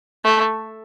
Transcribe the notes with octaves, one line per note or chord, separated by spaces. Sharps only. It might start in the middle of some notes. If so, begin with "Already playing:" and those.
A3